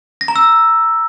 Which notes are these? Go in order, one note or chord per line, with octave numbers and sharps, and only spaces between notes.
A#6
A#5
E6